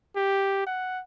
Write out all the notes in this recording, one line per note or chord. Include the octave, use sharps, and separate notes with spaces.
G4
F#5